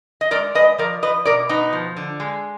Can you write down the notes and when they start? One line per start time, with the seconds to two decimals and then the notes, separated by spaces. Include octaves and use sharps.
0.21 D#5
0.31 G#3 A#4 D5
0.55 G#3 B4 D#5
0.78 F3 A#4 D5
1.02 F3 B4 D#5
1.25 B2 A#4 D5
1.49 B2 B3 D#4
1.73 F3
1.97 D3
2.20 G#3